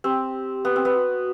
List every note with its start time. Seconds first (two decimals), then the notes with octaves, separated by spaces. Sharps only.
0.04 C4 G4
0.65 B3
0.76 C4
0.85 B3
0.96 F#4